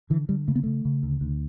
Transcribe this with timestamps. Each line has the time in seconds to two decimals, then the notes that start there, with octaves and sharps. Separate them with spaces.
0.10 D3 E3
0.29 D3 G3
0.48 C#3 A3
0.55 B3
0.63 C#3 A3
0.85 C#3
1.03 D2
1.21 D2